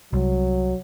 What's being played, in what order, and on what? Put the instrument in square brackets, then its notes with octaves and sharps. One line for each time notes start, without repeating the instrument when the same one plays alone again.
[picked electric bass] C2 [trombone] F#3